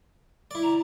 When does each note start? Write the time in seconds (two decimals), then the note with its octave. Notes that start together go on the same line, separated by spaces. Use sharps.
0.51 E4 D5
0.63 A#5